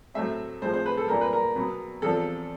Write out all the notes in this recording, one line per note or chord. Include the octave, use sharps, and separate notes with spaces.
A2 F#3 A3 C4 E5
A2 F3 G#3 C4 C5
C5
B4
A4
A#2 G3 A#3 A#4
B4
A#4
B2 F#3 B3
E2 C3 F3 A4